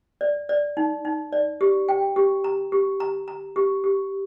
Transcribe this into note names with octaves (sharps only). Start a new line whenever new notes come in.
D5
D5
D#4
D#4
D5
G4
G5
G4
A#5
G4
A#5
A#5
G4
G4